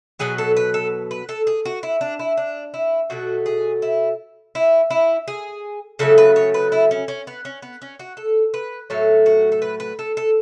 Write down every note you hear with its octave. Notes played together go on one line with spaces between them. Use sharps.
B2 F#3 B3 G#4
A4
B4
A4
B4
A4
G#4
F#4
E4
D4
E4
D4
E4
B2 F#3 A3 F#4
G#4
E4
E4
E4
G#4
C#3 F#3 A3 A4
B4
C#5
B4
E4
C#4
C#4
B3
C#4
B3
C#4
F#4
A4
B4
A2 F#3 A3 C#5
F#4
A4
B4
B4
A4
A4